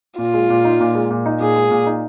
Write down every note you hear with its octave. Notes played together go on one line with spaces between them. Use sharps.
A#2 F4
G#3
A#2
D#4
A#2
G#3
A#2
D#4
A#2 G#4
G#3
A#2
D#4